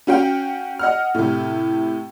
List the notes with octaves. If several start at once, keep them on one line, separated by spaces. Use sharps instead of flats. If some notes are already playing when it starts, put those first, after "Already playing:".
C#4 F#4 F5 G5
D#5 F#5 F6
A2 C3